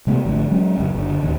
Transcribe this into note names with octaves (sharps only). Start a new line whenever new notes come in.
C3 G#3 A3 B3
G#1 D3 F3 A3
F#3 G#3 C#4
E1 C#2 F#2
F#1 D3
D1 D#2